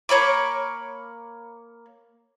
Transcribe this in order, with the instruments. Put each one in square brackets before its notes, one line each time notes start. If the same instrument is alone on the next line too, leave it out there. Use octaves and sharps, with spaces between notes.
[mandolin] A#3 C#5 B5 D6